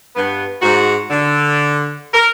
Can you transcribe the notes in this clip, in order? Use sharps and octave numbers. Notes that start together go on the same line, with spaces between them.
G2 B3
G#2 F#4
D3
A#4